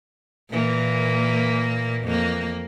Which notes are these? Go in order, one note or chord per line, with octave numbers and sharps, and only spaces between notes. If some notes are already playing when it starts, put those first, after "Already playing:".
A#2 E3 A#3
F2 A#3